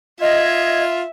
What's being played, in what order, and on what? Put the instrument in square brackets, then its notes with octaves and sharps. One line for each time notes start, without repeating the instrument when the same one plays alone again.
[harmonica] F4 [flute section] D#5 G#6 [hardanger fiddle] E5